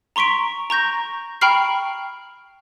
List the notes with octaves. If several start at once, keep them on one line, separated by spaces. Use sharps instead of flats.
A#5 C6 C#6 B6 D7
A#5 C#6 G6 A#6
G5 A#5 B5 C#6 F6 C7